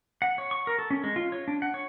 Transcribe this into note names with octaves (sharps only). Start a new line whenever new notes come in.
F#5
C#5
C#6
A#4
A4
C#4
G#3
F4
C#5
D4
F#5
C#5